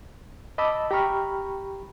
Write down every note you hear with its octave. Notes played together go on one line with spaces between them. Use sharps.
D#5 A5 B5 D6 E6
G4 G5 A#5 B5 C#6 F6